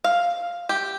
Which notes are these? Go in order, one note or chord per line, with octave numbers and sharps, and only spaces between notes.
F5
G4